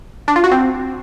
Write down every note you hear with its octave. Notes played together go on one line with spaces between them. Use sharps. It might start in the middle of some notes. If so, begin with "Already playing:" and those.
D4
F4
F#4
C4